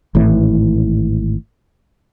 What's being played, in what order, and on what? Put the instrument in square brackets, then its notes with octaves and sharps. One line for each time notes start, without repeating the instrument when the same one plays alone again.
[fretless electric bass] G#1 A2 E3